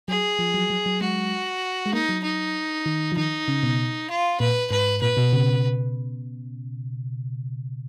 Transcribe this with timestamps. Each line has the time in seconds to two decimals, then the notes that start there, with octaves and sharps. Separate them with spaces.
0.08 F#3 G#4
0.39 F3
0.54 F#3
0.70 F#3
0.86 F#3
1.01 G#3 F#4
1.86 G#3
1.93 A#3 D#4
2.09 F#3
2.24 D#4
2.86 D#3
3.12 F3
3.17 D#3 D#4
3.48 C#3
3.63 B2
4.10 F4
4.40 A#2 B4
4.71 G#2 B4
5.01 A#2 B4
5.17 B2
5.33 C#3